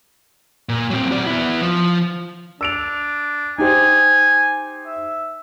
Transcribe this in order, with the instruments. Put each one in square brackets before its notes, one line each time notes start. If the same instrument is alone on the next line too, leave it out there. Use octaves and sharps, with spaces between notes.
[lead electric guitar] A#2
F#3 C4
F#4 D5
B3 E4
F3
[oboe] D4 [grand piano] E6 D7 F7
[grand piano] D#4 G4 C5 [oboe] G#5
[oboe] E5